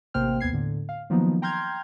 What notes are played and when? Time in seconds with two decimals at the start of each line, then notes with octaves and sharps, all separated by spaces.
0.14 A1 C3 A#3 C5 G5 F6
0.40 D#2 B3 G#6 C7
0.53 A2 D3
0.89 F5
1.10 D#3 F3 F#3 A#3 B3 D#4
1.42 G5 A#5 C6 F6 G6 G#6